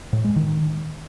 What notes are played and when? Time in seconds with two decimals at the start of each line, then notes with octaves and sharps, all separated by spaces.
0.13 A2
0.24 G#3
0.36 D#3